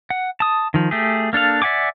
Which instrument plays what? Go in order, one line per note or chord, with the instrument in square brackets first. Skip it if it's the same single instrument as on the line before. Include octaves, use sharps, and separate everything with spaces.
[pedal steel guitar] F#5
A5 D#6
D#3 F3
A3 G4 G#4
A#3 D4 A4 F5
D5 E5 F#5 G#5 D6